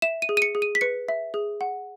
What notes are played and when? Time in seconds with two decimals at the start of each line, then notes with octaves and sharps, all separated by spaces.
0.02 E5 E7
0.22 D#7
0.29 G#4
0.37 D#7
0.42 C#7
0.55 G#4
0.62 D#7
0.75 B6
0.81 B4 C#7
1.09 E5
1.34 G#4
1.61 F#5